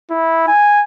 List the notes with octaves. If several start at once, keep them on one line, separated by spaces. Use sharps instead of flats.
E4
G#5